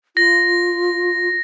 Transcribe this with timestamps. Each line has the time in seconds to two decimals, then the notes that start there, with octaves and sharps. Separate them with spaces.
0.17 F4 A#6